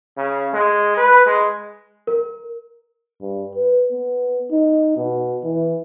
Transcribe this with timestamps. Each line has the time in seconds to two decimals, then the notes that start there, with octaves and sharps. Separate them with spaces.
0.18 C#3
0.54 G#3
0.97 B4
1.26 G#3
2.07 A#4
3.21 G2
3.55 B4
3.92 B3
4.51 D#4
4.97 B2
5.44 E3